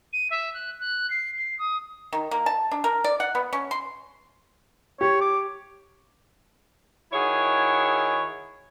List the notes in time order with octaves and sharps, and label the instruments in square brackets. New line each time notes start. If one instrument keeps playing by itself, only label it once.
[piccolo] D#7
E5
F#6
F#6
C7
C7
D#6
[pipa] D#3
A#3
A5
D4
A#4
D5
F#5
B3
C#4
C6
[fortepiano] G4 [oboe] C#5
[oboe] D6
[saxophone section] D#3 E4 F#4 G#4 C#5